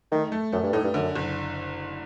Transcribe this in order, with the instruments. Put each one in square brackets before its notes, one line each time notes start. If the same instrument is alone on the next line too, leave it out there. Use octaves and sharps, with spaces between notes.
[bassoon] D#3 [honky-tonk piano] A3
[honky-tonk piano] A3
[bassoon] F#2 [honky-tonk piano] A3
[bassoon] G2
[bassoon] A2 [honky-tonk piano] D#4
[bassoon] G2
[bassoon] F#2 [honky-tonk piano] D3
[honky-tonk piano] F#1